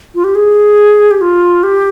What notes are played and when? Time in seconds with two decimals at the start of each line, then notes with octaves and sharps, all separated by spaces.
0.15 F4
0.24 G4
0.35 G#4
1.11 G4
1.21 F4
1.63 G4